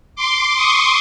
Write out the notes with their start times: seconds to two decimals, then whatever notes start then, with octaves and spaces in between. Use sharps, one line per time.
0.16 C6 D6
0.55 C#6 D#6